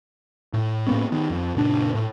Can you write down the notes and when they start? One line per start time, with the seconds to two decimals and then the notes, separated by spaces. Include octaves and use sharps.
0.53 A2
0.87 A2 A#3 B3 C#4
1.12 D#3 B3
1.30 F2
1.55 F#1 A#2 C#4 D4
1.95 A2